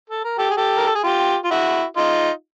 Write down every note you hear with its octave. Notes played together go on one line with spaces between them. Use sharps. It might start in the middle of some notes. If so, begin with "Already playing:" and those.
A4
A#4
G4 A4
G#4
G4 A4
A#4
A4
G#4
F4 G4
F4
E4 F#4
D#4 F4